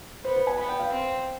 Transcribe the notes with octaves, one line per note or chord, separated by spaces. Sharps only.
B3 C5
B4
G#5
B3 B5
G5
F5
C4